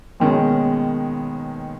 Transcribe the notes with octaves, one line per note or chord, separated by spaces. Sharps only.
D#2 B2 D#3 G#3 C#4